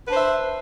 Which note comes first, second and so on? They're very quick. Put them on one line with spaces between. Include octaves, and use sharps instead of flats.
B4 D4 C5 E5